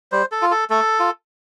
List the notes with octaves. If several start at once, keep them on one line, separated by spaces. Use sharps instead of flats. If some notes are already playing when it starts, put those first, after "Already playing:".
G3 C5
A4
F4
A4
A3 A4
F4